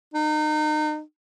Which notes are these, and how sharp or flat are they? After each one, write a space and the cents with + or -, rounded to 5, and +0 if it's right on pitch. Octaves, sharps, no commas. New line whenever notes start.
D#4 -30